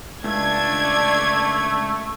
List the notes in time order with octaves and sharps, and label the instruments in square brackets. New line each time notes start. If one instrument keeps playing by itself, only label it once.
[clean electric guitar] C#2 [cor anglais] A3 [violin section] D4 G#6